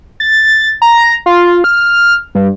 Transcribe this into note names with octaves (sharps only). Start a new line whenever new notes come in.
A6
A#5
F4
F6
G2